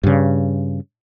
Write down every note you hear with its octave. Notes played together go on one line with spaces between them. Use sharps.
G2 C#3